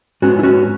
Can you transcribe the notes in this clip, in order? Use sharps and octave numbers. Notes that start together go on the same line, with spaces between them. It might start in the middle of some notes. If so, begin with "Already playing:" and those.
G#2 G#3 B3 C#4 F#4
E4
C#4 F#4